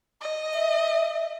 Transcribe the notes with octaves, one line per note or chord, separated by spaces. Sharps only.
D#5
E5